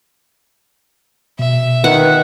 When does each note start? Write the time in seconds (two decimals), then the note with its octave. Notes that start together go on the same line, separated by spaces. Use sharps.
1.39 B2 E5
1.84 D#3 B4 F#5